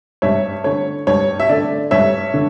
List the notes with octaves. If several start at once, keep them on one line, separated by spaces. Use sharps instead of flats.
G2 C#5 E5
D3 A3 C#5
G2 C#5
E5
D3 A3 D5
G2 C#5 E5
D3